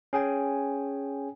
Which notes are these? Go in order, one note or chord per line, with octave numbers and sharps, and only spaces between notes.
C#4 G#4 G5 G#5